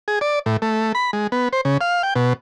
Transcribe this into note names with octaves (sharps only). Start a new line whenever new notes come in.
G#4
D5
A2
A3
B5
G#3
B3
C5
C#3
F5
G5
B2